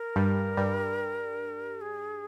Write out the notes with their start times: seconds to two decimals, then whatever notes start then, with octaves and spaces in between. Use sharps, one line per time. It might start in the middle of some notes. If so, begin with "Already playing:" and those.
Already playing: A#4
0.16 G2 G3
0.57 G2 G3
1.81 G#4